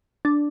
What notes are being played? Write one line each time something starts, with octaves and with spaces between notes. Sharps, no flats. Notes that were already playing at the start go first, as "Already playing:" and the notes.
D4